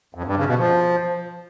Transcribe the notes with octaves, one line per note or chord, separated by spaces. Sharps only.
F2
G2
C#3
B2
F3